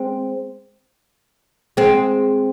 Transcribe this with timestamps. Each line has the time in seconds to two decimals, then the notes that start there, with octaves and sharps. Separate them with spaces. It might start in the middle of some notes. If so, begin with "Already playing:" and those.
Already playing: G#3 C4
1.77 G#3 C4